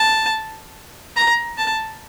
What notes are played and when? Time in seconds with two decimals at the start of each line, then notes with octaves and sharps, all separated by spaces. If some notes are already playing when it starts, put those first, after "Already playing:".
Already playing: A5
1.16 A#5
1.58 A5